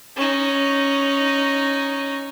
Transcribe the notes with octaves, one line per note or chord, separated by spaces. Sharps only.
C#4 D#4